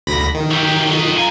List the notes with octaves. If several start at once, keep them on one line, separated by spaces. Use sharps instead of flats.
D2 B5 A#6
D#3
F#3 G4
F#3 F4 A4 D#5
F#2 F5 G#5 A#5